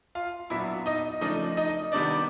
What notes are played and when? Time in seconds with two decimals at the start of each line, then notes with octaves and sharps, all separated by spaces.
0.15 F4 F5
0.50 A#2 F#3 B3 D4 E4 E5
0.86 D#4 D#5
1.21 C#3 F3 A3 D4 D#4 D#5
1.57 D#4 D#5
1.92 C3 D#3 G3 B3 D4 D5